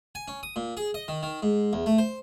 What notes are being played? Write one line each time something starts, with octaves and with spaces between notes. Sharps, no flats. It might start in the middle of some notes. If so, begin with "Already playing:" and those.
G#5
C#4
D#6
A#2
G#4
D#5
D#3
D#3
G#2
E2
A3
C5